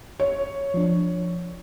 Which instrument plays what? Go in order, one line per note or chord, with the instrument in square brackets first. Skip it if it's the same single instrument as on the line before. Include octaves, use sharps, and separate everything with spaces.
[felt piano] C#5
[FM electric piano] F3 D4